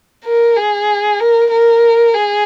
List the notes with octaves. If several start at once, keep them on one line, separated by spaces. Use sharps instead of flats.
A#4
G#4
A#4
A#4
G#4